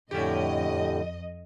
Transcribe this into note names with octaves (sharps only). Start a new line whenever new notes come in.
F2 A2 D3 C#4 G4 D#5